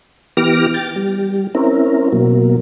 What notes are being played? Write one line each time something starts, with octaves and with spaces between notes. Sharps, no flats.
E3 B3 G4 D6 F6 A#6
G5 A6
G3
C4 C#4 E4 A#4
B2 F#3 A#3